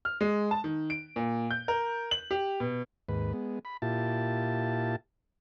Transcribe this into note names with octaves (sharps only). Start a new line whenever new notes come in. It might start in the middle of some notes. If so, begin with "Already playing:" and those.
F6
G#3
A5
D#3
D7
A#2
G6
A#4
F#7
G4
B2
D#2 G#2 B4
G#3 B3
B5
A#2 E4 F4 G4 A5